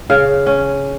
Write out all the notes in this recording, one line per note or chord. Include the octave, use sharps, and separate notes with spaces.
C#3 F5
C#4